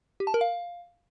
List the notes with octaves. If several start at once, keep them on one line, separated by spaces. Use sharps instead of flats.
G4
A5
A#4
F5